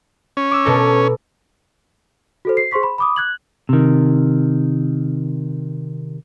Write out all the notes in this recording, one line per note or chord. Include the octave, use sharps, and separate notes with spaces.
C#4
D6 E6
B2 A4 A#4
F#4 A4 C5
C7
G#4 C5 C6 C#6 B6
B5
B5 D6 D#6
F#6 G#6 F#7
C3 D#3